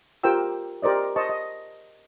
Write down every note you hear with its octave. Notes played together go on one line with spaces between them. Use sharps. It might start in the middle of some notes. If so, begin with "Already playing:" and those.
F4 G4 A#4 C5 G5 E6
G4 A#4 C5 D5 D#5
C5 D#5 A5 C#6
D#5